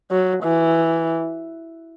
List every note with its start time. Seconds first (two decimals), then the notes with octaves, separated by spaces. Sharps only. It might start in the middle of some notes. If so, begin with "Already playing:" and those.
0.11 F#3
0.43 E3